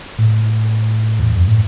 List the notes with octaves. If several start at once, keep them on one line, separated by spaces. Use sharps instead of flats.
A2
E2
F#2
A2